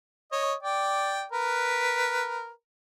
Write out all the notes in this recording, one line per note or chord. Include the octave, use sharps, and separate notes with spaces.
C#5 D#5
D5 G5
A#4 B4